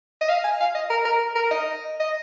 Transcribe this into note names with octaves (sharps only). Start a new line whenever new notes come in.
D#5
F5
G#5
F5
D#5
A#4
A#4
A#4
D#5
D#5